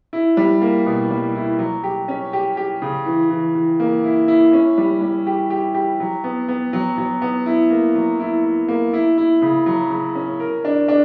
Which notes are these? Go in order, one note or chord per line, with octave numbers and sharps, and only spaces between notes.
E4
G3
A#3
B2
G3
E4
F#3
G4
C#4
G4
G4
C#3
E3
E3
E3
A#3
E4
E4
C#4
G3
G3
G4
G4
G4
F#3
B3
B3
F#3
F#3
B3
E4
A#3
F#3
E4
E4
A#3
E4
E4
C#3
F#3
C#3
C#4
A#4
D4
D4